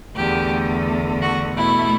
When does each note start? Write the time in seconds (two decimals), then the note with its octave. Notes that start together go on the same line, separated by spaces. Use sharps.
0.15 E2 D3 A3 G4
1.21 F#4
1.56 B2 A3 E4